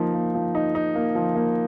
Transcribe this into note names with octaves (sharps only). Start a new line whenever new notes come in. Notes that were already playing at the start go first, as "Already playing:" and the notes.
Already playing: F3 A#3 D#4
A#3
F3
D#4
D#4
A#3
F3
A#3